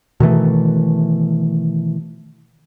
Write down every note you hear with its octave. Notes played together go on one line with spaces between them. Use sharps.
B2 D#3 E3 A3